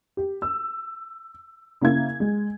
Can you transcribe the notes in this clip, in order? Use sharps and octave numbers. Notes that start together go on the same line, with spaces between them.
G4
E6
C#3 A#3 E4 F5 G#6
G#3